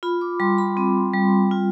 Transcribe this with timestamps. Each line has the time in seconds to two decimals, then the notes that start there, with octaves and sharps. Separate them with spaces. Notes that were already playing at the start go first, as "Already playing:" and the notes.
0.03 F4 B5
0.21 D6
0.40 G3 C6
0.58 B5
0.77 C4
1.14 G3
1.51 F4